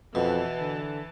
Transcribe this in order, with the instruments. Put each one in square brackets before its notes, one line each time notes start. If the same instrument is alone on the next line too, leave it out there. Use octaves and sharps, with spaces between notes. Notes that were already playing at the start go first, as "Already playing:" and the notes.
[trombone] F2 [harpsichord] B2 [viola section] E3 B4 A5
[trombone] D3